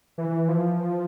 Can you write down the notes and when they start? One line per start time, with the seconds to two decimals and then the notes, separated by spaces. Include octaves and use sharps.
0.18 E3
0.48 F3